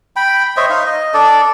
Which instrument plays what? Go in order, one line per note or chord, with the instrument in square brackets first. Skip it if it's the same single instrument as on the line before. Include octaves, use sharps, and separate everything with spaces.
[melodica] G5 B5
C5 C#5 D#5 E5
D#4 F5
D#5
D4 A4 D5